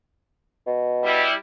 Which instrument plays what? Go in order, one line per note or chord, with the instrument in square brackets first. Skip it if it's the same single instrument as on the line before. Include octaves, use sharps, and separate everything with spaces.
[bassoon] B2
[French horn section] G3 E4